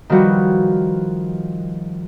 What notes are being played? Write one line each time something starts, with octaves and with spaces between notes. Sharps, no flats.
D#3 F3 G3 F#4 B4